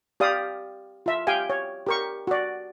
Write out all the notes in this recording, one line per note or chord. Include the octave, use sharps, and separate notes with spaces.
G4 D5 F5 D#6
F4 E5
G4 F5 G5 G#5
C#5
G4 A#4 C#6
F#4 D5